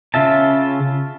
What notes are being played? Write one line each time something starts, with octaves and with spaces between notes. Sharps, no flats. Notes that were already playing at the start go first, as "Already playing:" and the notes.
C#3 F4 E5 A5